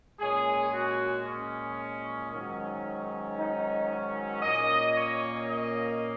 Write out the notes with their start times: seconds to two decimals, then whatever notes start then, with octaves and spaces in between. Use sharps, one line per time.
0.20 A#2 G#3 C#4 G#4
0.73 F#4
1.25 C#4
2.32 G#2 D#3 F#3 C#4
3.37 D#4
4.43 A#2 A#3 C#4 D#5
4.96 C#5
5.49 D#5